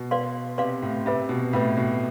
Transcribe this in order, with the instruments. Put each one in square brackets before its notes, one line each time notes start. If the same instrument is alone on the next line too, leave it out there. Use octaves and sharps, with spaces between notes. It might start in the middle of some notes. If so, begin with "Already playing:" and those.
Already playing: [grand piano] B2
[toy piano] B4 D5 F5 C6
[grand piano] C3 [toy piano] B4 D5 F5 C6
[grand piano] A2
[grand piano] C3 [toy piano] B4 E5 B5
[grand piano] B2
[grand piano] A2 [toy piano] B4 E5 B5
[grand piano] B2